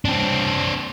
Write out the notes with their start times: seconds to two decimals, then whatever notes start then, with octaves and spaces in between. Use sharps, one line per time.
0.05 C4 D4